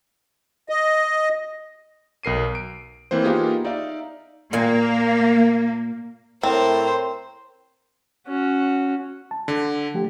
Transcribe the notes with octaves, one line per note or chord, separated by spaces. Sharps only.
D#5
B1 A#4 C7 D#7
D7
E3 A#3 C4 C5
A#3 B3 D#4 F4 G4 G#4
D#4 D5 E5 F5
A#2 A#3 G#5
A2 C4 A#4 C5
C#4 F#4
A5
D3
F3 A3 G4